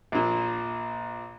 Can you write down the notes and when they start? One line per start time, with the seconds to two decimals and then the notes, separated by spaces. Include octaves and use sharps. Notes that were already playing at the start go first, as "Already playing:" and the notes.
0.12 A#1 A#2